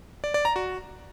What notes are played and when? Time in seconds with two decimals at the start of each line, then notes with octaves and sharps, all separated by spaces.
0.24 D5
0.34 D5
0.45 A#5
0.56 F#4